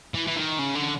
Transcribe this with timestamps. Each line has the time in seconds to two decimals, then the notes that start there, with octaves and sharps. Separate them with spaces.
0.14 E3
0.27 E3
0.36 D#3
0.59 C#3
0.75 D3